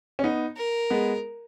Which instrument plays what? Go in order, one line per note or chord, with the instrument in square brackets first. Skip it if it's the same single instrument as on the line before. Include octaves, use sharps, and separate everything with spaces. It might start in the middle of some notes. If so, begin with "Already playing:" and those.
[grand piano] C#4
B3 D#4
[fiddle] A#4
[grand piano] G#3 B3